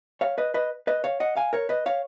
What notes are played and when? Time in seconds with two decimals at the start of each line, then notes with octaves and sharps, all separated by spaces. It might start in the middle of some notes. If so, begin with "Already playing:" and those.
0.21 C#5 F5
0.38 B4 D#5
0.54 B4 D#5
0.87 B4 D#5
1.04 C#5 F5
1.20 D#5 F#5
1.37 F5 G#5
1.53 A#4 C#5
1.69 B4 D#5
1.86 C#5 F5